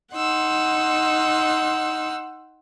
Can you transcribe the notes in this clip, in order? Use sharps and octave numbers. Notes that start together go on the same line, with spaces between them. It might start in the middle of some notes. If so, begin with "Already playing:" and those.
D#4 F#5 C6 E6